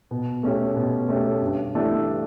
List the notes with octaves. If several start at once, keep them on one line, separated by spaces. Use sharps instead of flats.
B2
A3 C#4 G4
B2
A3 C#4 G4
G2
E3 A3 D4 G4